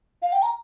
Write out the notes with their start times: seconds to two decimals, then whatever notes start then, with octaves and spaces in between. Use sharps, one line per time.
0.22 F5
0.33 G5
0.42 A#5